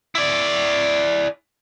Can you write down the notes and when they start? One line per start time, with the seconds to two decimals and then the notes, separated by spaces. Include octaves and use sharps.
0.15 E4 D5